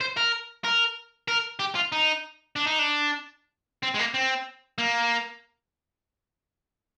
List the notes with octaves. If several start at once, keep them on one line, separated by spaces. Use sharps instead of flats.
C5
A#4
A#4
A#4
G4
F4
D#4
D4
D#4
D4
C4
G#3
A#3
C4
A#3